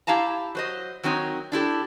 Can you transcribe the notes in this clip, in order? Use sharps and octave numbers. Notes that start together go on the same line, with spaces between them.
E4 G4 F5 A5 A#5
F#3 C5 D#5
D#3 F#3 C4 D#4 C#5
D4 E4 G4 A4